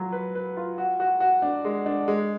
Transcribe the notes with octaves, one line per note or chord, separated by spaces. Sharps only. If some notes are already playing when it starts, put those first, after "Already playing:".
Already playing: F#3 F4
B4
B4
F4
F#4
F#4
F#4
D4
G#3
D4
G#3